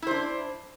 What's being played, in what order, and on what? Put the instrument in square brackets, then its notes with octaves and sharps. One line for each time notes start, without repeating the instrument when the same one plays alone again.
[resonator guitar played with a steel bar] E4
C5
D4